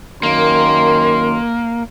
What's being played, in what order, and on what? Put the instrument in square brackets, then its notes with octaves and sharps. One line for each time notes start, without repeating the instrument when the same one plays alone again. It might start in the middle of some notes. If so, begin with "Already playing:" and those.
[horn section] F#2 D#3 C6 [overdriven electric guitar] A#3